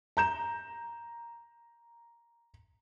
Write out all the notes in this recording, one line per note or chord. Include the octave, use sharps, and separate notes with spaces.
A#5 G6 E7